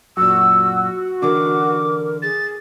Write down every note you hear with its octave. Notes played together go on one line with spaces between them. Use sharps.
F#2 A#2 F#4 E6
D3 E3 D4 A#4 D6
G#4 A6